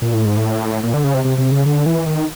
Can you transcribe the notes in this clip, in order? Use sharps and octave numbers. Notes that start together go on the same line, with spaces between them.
A#2
A2
G#2
A2
A#2
D3
C#3
C3
C3
C3
C#3
D3
E3
D#3